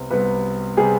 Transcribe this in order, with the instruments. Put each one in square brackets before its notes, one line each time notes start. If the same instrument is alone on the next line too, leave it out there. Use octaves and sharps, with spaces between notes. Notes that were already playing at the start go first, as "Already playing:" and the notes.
Already playing: [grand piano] C2 C3 G3 B3
[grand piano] C2 C3 G3 B3 [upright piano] B4
[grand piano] C3 G3 B3 [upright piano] G#4